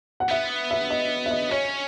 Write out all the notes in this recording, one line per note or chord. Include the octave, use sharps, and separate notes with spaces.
F#5
B3 E5
E5
D#5
E5
D#5
C#4 C#5